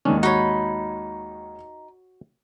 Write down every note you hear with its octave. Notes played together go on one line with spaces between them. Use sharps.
D#2 G#2 D#3 C#4 D4
D#4 F#4 C#5 B5